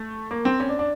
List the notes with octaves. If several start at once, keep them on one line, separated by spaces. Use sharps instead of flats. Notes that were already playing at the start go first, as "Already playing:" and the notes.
Already playing: A3
A#3
C4
C#4
D4
D4